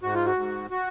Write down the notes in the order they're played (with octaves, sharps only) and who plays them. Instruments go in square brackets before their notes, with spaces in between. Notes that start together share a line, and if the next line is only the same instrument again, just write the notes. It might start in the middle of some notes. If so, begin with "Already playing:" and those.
[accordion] G#2 F#4
F4
F#4
G#2
F#4